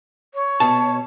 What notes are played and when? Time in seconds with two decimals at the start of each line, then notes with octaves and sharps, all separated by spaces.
0.34 C#5
0.60 B2 A5